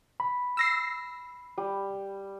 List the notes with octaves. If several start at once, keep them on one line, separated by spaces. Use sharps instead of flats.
B5
E6 A#6 C7
G3